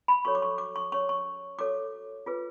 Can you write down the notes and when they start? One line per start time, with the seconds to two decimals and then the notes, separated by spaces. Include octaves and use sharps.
0.08 B5
0.25 F#4 A4 C#5 C#6
0.35 D6
0.42 C#6
0.58 D6
0.76 C#6
0.92 C#4 G#4 C#5 C#6
1.09 C#6
1.59 F#4 A4 C#5 D6
2.26 F4 G#4 B4